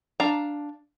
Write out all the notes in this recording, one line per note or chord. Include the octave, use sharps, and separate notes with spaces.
D4 F5 A#5